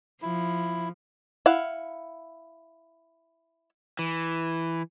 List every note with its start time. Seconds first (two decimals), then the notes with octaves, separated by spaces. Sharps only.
0.22 F3 E4
1.46 E4 F5 F#5
3.99 E3